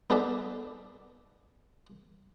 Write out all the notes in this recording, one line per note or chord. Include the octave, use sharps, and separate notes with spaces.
B3 D#4 G#4 A4 D5 E5